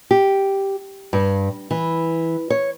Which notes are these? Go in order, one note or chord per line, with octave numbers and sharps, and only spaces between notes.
G4
G2
E3
C#5